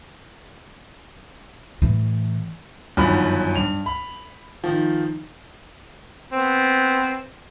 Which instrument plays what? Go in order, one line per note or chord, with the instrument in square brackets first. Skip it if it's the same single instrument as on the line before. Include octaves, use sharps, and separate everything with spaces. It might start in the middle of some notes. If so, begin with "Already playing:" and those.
[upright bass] A2 E3
[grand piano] G1 F#2 D#3 F3 C#4 B5
G2 F7
B5
D#3 F3
[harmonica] B3 C4